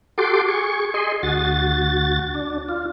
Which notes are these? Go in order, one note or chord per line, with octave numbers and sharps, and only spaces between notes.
F#4 G4 A4 C6 D6
G#4 C#6
G#4 D#5 C6
D2 F#4 A6
D4
F4